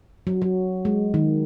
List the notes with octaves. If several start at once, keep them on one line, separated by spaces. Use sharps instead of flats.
F#3
F#3
G#3
D#3